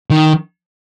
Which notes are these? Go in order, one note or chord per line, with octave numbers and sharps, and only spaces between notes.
D#3